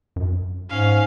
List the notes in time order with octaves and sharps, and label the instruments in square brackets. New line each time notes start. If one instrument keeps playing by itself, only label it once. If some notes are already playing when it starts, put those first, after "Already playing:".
[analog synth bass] F#2
[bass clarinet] G#2 [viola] C#4 [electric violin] F5